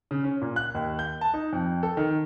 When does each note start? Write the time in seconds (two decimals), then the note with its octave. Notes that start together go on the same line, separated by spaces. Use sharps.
0.11 C#3
0.24 C#4
0.42 A#2
0.56 F#6
0.75 D#2
0.99 G6
1.21 A5
1.34 D#4
1.53 F2
1.83 A4
1.97 D#3